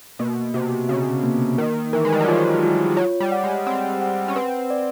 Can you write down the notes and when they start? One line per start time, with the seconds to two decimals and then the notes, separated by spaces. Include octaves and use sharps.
0.19 B2 A#3
0.54 C3 F#4
0.89 C#3 F#4
1.23 A#3
1.58 D#3 A#4
1.93 E3 A#4
2.05 G#3
2.12 G3
2.20 F#3
2.28 F3 F4
2.63 F4
2.97 F#3 C#5
3.20 G3
3.32 F#5
3.44 G#3
3.66 C4 F#5
4.01 F#5
4.28 C#4
4.36 C4 B4
4.70 D5